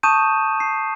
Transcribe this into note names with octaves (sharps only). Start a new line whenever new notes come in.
A5 C#6 D#6 G6 D#7 E7
C7